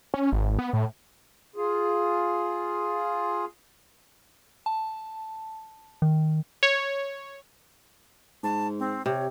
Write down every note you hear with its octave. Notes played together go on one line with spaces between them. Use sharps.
C#4
G#1
B3
A2
F4 G#4
A5
D#3
C#5
G#2 A5
C4
C3 C#5